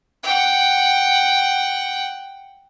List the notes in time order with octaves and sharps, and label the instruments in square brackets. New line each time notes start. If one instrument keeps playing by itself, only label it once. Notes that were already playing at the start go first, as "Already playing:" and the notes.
[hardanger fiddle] F#5 G5